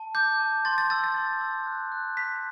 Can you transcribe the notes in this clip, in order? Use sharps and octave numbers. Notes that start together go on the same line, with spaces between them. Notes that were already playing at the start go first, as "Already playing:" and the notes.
Already playing: A5
D6 G6
A5
C6 A6
A6
E6 A6
A6
C6
E6
F#6
F#6
F#6 B6